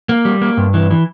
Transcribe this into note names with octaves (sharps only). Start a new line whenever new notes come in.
A#3
G3
A#3
G2
E3
E3